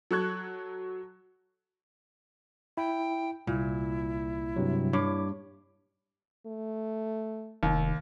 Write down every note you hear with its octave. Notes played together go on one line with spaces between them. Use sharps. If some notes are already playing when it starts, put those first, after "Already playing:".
F#3 A4 C#6 F#6 G#6
E4 G5
C2 A#2 E4
G2 C3 F#3
G2 C#5 D6
A3
F1 D#2